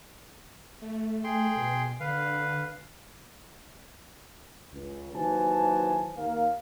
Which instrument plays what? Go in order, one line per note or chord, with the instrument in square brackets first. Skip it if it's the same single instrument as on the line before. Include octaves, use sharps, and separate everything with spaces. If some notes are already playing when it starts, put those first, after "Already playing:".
[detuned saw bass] A3
[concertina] G#4 G5 C6
[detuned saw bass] B2
[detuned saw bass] D3 [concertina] B4 F5
[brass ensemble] C#2
D#2 E3 F#3 C5 G#5 A5
D#2 A#3 F5